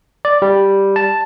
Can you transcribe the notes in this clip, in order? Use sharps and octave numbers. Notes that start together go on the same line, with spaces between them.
D5
G3
A5